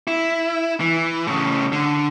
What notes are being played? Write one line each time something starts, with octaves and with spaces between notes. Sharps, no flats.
E4
E3
A2 C#3
D3